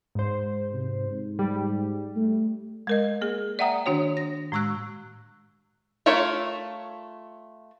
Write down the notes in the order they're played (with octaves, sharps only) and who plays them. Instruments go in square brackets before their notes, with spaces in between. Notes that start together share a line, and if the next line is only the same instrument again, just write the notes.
[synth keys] G#2 C5
[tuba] C3
G#2
[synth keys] G3
[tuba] A3
[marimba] G#3 A#4 D#5
A#3 G#4
D5 E5 F#5 G5 A#5 D#6
D#3 D4 F#4 C#5
A#6
A2 G#3 C#6 E6 F#6
[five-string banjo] A3 F4 A#4 C#5 E5